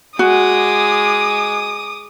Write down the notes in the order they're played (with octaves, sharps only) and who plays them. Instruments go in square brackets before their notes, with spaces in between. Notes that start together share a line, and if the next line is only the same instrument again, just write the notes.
[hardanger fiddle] G#3 [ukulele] F#4 [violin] D6 D#6